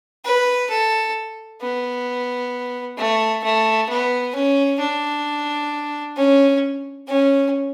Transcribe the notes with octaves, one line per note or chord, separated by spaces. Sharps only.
B4
A4
B3
A3
A3
B3
C#4
D4
C#4
C#4